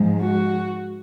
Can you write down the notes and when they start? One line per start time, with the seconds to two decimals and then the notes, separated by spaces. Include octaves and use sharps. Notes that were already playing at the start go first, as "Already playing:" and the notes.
Already playing: G#2 F3 G#3
0.21 F#4